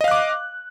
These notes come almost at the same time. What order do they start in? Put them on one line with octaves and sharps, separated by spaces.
D#5 F5 F#6 D6